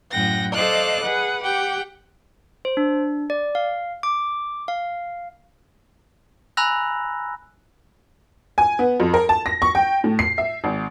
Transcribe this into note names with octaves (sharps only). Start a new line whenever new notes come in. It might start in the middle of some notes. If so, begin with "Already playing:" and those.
F#2 A2 F#5 G5 A#6
A4 C5 D5 D#5 F5 F#6
G#4 B4 F#5
G4 F#5 G5
C5
D4
D5
F5
D6
F5
G#5 A#5 B5 E6 F#6 A#6
G#5
B3
F2
A#4
A5
A#6
C#6
G5
A2
C7
E5
G#1